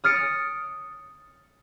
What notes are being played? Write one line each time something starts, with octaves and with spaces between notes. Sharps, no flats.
D#6 F6 A6 C#7 D7